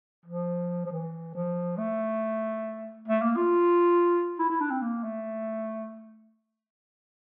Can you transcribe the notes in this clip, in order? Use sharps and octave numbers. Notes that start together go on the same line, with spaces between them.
F3
F3
E3
F3
A3
A3
A#3
F4
E4
E4
D4
C4
A#3
A3